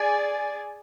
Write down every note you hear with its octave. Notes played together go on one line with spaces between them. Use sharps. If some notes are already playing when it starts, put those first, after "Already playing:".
Already playing: G#4 D5 G#5